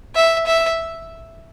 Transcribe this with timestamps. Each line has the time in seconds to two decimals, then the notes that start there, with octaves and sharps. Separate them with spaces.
0.15 E5
0.46 E5